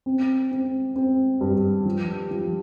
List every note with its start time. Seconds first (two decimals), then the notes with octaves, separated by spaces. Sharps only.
0.06 C4
0.51 C4
0.96 C4
1.41 G2
1.85 F3
2.31 F3